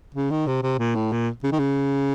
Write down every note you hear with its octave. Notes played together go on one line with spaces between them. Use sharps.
C#3
D#3
C3
C3
A#2
A2
A#2
C#3
D#3
C#3